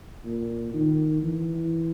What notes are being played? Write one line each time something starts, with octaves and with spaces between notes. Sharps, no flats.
A#2
D#3
E3